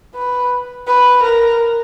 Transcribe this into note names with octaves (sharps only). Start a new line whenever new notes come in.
B4
B4
A#4